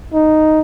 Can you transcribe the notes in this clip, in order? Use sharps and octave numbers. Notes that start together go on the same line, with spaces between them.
D#4